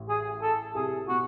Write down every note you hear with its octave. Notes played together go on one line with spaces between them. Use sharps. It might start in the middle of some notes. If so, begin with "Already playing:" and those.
Already playing: A1 A2
G#4
A4
C2 C3 G#4
B2 F#4